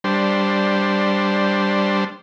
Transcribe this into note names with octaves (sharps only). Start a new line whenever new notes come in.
G3 D4 C5